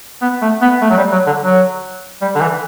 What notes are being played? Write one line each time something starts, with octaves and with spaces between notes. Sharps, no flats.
B3
A3
B3
A3
F#3
G3
F#3
D3
F#3
G3
D3
E3